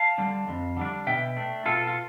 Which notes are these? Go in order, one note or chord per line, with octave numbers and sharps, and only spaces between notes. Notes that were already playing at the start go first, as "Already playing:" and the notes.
Already playing: F5 A5
D3 G3 D4
F2
D3 G3 D4
B2 E5 G5
A3 D4
B2 F4 A4
F4